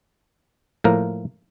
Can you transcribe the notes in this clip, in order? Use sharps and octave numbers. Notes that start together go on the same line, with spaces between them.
A2 F3 A#3 A#4